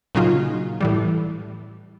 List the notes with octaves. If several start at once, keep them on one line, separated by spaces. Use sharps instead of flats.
A#2 C#3 F#3 D#4 F4
A2 E3 G3